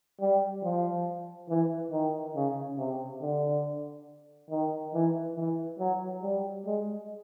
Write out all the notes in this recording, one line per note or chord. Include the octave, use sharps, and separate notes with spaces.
G3
F3
E3
D#3
C#3
C3
D3
D#3
E3
E3
F#3
G3
G#3